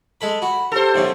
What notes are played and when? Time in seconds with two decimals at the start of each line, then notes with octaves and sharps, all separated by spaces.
0.21 G#3 A4 B5
0.42 F#4 B5
0.72 G4 A4 C5
0.95 B1 C3 C#4